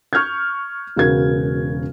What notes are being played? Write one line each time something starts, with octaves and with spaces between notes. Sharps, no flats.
C#6 F6 G6 G#6
E1 C#3 F#4 A#4 G#6